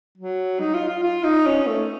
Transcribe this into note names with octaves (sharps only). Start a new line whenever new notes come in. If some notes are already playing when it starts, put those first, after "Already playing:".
F#3
D#4
F4
F4
F4
D#4
C#4
A3